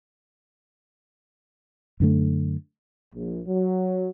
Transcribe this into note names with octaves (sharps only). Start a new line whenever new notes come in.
F#2 D3 A3
A#1
F#3